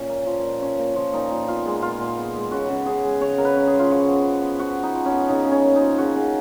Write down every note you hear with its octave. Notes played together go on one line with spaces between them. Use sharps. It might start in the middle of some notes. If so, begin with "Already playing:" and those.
Already playing: A#2 C#4
A#3
F3
A#2
C#4
A#3
F3
A#2 D#4
A#2
B3 F4
G#3
A#2 F4
A#2
B3
G#3
C#3 F#4
C#3
C#4 G#4
G#3
C#3 C#5
C#3 A#4
B4
C#4
G#4
G#3
F4
F3 F#4
B3
F3
B3
F3 F#4
B3
D#4
F3
C#4
B3
C#3 D#4
C#3
C#4
A#3
D#4
F3
C#3 F#4
C#3